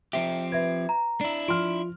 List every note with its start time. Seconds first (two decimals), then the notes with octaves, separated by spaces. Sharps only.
0.13 F3 C4 G4 E5
0.52 B4 E5 G#6
0.89 A#5
1.21 D4 E4
1.48 F3 C6 F6 D7